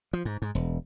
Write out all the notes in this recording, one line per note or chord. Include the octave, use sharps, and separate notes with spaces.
F3
G#2
G#2
E1